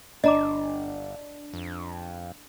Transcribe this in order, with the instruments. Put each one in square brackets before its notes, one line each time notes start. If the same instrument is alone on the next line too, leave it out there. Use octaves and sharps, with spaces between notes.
[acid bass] G1 [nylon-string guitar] D4 [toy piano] D#5 A#5 D6
[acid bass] F2